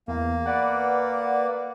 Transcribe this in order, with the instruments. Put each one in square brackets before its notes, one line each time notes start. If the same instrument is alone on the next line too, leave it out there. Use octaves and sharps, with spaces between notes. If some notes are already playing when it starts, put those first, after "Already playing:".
[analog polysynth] E2 [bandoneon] A#3
[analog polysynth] B4 D5 F#5